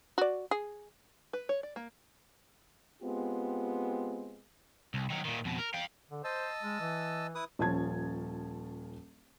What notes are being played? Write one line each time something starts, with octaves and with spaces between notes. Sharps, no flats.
F#4 D5
G#4
B4
C#5
D5
A#3
G#3 B3 C4 F4 G4
C2
D#3 F#3
A#2 D#3
F2 B2
A#4
F5 G5
D3
C5 D#5 A5 E6
G#3
E3
E4 B4 D#6
D#1 F3 C#4 A5 G#6